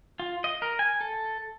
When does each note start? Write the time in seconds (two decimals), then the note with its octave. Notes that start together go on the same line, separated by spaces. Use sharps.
0.20 F4
0.44 D#5
0.62 A#4
0.79 G#5
1.01 A4